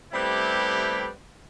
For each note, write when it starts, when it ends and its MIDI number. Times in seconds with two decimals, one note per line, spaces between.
0.13 1.07 55
0.13 1.07 57
0.13 1.07 59
0.13 1.07 60
0.13 1.07 64
0.13 1.07 67